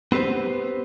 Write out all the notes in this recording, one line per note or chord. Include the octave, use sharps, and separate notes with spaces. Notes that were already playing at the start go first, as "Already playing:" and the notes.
B3 C4 G4 B4 C5